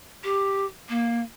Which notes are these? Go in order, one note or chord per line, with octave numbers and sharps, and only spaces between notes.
G4
A#3